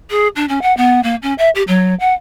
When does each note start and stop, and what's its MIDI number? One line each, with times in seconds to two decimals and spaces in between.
0.10 0.28 68
0.36 0.45 62
0.49 0.62 61
0.62 0.75 78
0.77 1.03 59
1.03 1.16 58
1.23 1.34 61
1.38 1.49 76
1.55 1.63 67
1.68 1.95 54
2.00 2.13 78